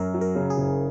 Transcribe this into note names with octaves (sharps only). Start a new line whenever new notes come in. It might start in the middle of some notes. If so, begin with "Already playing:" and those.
Already playing: F#2 A#4
F#3
A#4
C#3
G#4
F#1